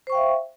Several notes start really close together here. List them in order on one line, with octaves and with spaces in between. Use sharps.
C5 C#6 G5 F5 E5